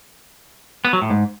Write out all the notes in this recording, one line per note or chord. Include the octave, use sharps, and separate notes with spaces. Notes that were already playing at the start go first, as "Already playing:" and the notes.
B3
F#3
A2
G#2